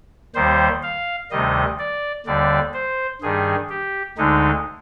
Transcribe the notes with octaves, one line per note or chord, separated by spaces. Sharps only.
D#2 D#3 G3 C5
F5
D2 C3 D#3 G3 D#5
D5
D#2 D3 G3 D5
C5
G2 D#3 G3 G#4
G4
D2 D3 G#3 D#4